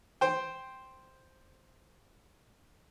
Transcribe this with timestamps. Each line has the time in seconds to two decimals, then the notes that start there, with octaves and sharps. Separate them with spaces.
0.21 C5 G5